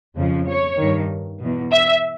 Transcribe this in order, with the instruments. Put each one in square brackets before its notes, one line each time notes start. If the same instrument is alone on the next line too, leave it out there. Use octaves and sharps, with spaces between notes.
[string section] F2 C#3 F3
C#5
G2 D#3
E2 B2
E5